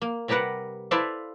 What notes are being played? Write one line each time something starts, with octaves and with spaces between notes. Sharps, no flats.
A#3
C3 G3 G4 A#4 B4 F#5
E4 A4 B4 C5 D5 F5